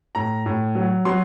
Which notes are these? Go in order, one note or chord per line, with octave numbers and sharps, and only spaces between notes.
A2 A#5
A2
F#3
F#3 C6